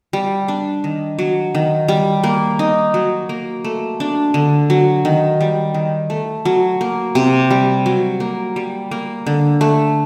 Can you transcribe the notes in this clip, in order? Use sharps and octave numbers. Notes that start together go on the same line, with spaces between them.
G3
D4
D#3
F#3
D#3
G3
A#3
D#4
F#3
A#3
A3
D4
D3
F#3
D#3
G3
D#3
A3
F#3
A#3
C3
G3
F#3
A#3
G3
A#3
D3
A3